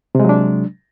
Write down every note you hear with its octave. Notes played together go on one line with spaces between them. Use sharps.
C3 F#3 G#3 D4